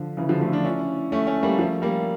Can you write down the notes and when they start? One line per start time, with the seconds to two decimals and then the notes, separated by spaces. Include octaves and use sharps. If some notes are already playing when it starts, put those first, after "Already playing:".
Already playing: D3 F3
0.17 C#3 E3
0.29 D3 F3
0.41 F3 A3
0.53 D4 F4
0.65 C#4 E4
1.12 A3 C#4
1.27 A3 C#4
1.43 G3 A#3
1.58 F3 A3
1.82 G3 A#3